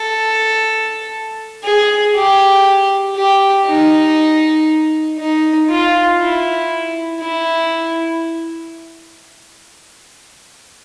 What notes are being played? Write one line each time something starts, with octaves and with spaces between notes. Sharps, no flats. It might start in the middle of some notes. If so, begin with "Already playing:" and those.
Already playing: A4
G#4
G4
G4
D#4
D#4
F4
E4
E4